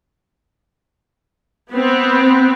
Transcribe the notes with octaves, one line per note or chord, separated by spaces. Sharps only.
B3 C4